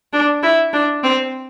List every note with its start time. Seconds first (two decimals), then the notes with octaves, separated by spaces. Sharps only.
0.13 D4
0.43 E4
0.73 D4
1.03 C4